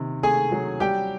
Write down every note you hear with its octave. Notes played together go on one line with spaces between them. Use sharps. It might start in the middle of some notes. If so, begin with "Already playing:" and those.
Already playing: C3 D#3
A3 G#4 G#5
F#3
G3 G4 G5